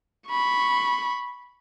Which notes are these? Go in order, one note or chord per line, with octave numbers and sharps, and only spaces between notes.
B5 C#6